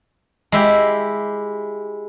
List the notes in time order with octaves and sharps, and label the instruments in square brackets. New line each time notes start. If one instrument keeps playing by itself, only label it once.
[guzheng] G#3 E4 G4